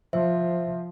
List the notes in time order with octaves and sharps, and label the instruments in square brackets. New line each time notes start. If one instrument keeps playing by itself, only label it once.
[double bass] F3 [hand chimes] C5 E5